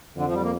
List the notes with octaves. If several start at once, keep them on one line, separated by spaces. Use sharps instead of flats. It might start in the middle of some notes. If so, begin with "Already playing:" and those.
F2 D3
F3
G3
A#3